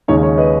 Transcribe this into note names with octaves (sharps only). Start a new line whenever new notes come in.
D#2 C#3 G#3 D#4 C#5
C#5
B4 D#5